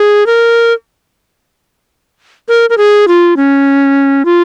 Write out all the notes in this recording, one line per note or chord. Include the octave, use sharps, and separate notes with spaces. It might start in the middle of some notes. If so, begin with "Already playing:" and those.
Already playing: G#4
A#4
A#4
A#4
G#4
F4
C#4
F4